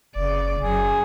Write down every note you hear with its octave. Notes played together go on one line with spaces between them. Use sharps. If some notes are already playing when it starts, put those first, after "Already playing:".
F#1 C#3 D5
F#1 F#2 G#4